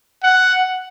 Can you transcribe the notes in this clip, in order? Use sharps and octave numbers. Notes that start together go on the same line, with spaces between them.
F#5